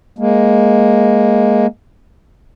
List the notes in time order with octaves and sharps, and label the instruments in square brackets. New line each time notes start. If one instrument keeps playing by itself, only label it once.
[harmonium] G#3 A#3